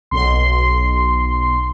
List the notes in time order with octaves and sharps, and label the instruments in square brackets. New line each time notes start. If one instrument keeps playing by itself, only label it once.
[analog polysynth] B1 C6